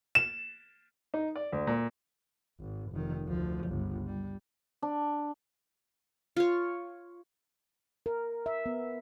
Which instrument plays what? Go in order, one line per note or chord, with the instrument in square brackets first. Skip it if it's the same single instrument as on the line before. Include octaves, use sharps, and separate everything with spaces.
[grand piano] E7
[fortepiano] D#4
D5
D2
A#2
[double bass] G#1
F1 D#3
D2 F3
G1 C#2
G3
[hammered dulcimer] D4
[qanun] F4 C#5
[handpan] A#4
E5
B3